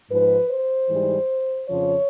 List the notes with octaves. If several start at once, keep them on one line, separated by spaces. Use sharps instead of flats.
G#2 F3 B4
C5
G#2 E3 G3
F2 C#3 F3 C#5